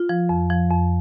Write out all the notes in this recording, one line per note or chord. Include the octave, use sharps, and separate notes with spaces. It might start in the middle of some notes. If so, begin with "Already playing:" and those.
Already playing: F4
F3
F2
F3
F2